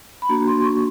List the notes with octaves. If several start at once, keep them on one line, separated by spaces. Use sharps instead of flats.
B5
A#3 D4 F#4 A#5
C6
C#6